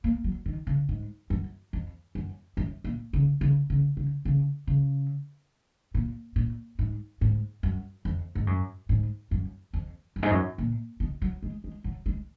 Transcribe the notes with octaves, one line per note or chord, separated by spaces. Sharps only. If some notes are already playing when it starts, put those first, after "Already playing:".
A#3
F#3
D#3
C#3
G#2
F#2
F2
F#2
F#2
A#2
C#3
C#3
C#3
C#3
C#3
C#3
A#2
A#2
G#2
G#2
F#2
F2
G#2
F#2
G#2
F#2
F2
F#2
G#2
F#2
A#2
B2
F#3
G#3
G#3
F#3
G#3